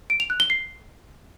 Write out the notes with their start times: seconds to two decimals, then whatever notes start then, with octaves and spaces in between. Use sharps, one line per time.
0.10 D7
0.20 F7
0.30 F#6
0.40 G7
0.50 C7